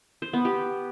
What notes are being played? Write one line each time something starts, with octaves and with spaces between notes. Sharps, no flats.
C5
B3
G4